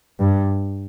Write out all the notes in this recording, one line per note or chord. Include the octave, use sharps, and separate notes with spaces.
G2